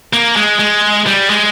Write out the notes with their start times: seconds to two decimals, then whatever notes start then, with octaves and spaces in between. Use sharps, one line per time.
0.13 A#3
0.36 G#3
0.59 G#3
1.07 G3
1.30 G#3